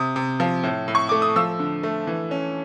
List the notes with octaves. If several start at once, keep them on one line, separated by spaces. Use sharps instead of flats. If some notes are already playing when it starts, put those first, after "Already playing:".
Already playing: C3 D#6
C3
F3
A2
A2
C#6
A3 D6
D#6
F3 E6
D3
A3
E3
C#4